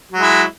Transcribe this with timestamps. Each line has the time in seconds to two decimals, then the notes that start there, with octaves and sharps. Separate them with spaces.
0.12 F#3
0.17 G#3
0.22 E4